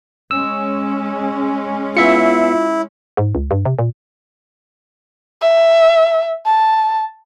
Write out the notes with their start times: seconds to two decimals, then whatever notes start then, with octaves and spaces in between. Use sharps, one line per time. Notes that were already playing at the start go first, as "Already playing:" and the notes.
0.31 G#3 C#4 E6
1.97 B3 E4 F4 E5 C#7
3.17 G#2
3.35 C#2
3.51 G2
3.65 C3
3.79 A#2
5.41 E5
6.46 A5